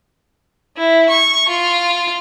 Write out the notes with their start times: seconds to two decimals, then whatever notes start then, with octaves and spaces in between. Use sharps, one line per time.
0.77 E4
1.09 C#6
1.49 F4